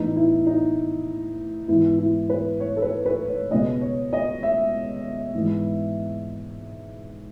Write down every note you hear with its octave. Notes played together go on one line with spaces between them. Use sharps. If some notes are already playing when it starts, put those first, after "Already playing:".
Already playing: A2 E3 B3 D#4
E4
D#4
G#2 E3 B3 E4
E4
B4
C#5
A4
B4
B4
C#5
C#2 B2 G#3 B3 D#5
C#5
D#5
E5
G#2 E3 G#3 B3